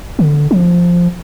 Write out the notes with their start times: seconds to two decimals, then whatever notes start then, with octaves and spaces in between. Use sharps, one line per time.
0.19 D3
0.51 F3